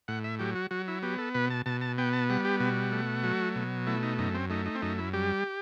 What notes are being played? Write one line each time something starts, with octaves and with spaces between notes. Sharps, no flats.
A2 F#5
E5
F#3 G4
F#4
F#3 F#4
E4
B3 G4
A4
B2 B4
A5
B2 A5
A5
B3 G5
A5
G3 F#5
G4
B2 F#4
A3
F#3
B2
A3 E4
D#4
F#2 D#4
C4
A3 D#4
D#4
C4
F#2 D#4
E4
G3 G4